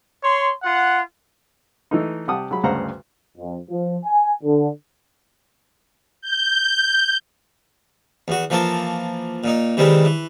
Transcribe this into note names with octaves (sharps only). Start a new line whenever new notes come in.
C#5 C6
F4 F#5
E3 A3 D#4
C3 G3 G4 F#5 A5 D#6
F#3 G#4 B5
D2 G2 C#3 C5 F#5 A#5
F2
F3
G#5
D3
G6
E2 F#4
E3 F3 A#3 A4
A#2 D#4
C3 D#3 E3 G3 G#3
E3